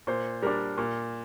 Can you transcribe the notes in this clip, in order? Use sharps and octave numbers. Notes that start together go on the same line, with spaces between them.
A#2 C5
G3 D4 A#4
A#2